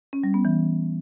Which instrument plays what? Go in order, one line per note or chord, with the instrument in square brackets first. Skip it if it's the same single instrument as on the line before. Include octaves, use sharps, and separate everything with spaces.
[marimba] C#4
G3
B3
E3